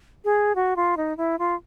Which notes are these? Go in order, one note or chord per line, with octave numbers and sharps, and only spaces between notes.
G#4
F#4
F4
D#4
E4
F4